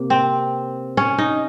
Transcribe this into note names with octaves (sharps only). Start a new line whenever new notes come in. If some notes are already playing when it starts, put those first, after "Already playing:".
Already playing: C3 A#3
C4
C#4
D#4